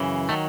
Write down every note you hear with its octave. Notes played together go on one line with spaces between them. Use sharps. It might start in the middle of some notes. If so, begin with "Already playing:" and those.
Already playing: F#2 C#3 E3
D#3 F#3 A3